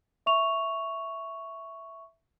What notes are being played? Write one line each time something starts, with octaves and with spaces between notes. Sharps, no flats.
E5 C#6 F7